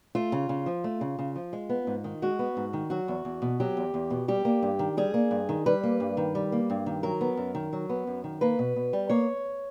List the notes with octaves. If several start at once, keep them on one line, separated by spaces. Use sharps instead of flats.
A3 F4
C#3
C#3
F3
A3
C#3
C#3
F3
G#3
B3
G#2
D#3
G#3 F#4
B3
G#2
D#3
F#3 F#4
E2
E2
B2
F#3 G4
E2
E2
B2
G3 G4
A#3
G2
D#3
G3 G#4
A#3
G2
D#3
G3 B4
A#3
G2
D#3
G3
A#3
G2
D#3
F#3 A#4
B3
F#2
D#3
F#3
B3
F#2
D#3
A#3 B4
B2
B2
G3
A#3 C#5